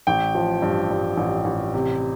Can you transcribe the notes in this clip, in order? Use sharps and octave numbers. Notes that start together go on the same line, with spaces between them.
A1 G5
F3
G2
G2
A1
A1
C3